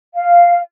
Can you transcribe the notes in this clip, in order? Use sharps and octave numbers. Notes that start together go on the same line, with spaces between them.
F5